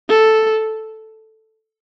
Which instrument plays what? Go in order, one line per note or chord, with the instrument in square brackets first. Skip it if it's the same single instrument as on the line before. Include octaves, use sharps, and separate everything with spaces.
[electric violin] A4